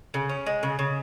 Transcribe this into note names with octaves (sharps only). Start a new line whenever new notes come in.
C#3
C#4
G#3
C#3
C#3